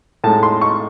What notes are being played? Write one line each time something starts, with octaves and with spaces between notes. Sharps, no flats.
A2 G#3 D#4 A5
C6
C#6